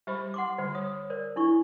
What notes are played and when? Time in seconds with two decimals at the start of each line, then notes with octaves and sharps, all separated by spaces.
0.07 G3 G4 C5 B5
0.34 F#5 C6 D6
0.58 D3 G3 C5
0.75 C#5 D#6
1.10 A#4 C5 D5
1.36 D4 E4 C#6